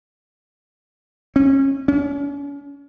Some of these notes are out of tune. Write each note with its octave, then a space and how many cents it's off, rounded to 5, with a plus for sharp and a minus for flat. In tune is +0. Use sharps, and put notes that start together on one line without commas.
C#4 -25
C#4 +40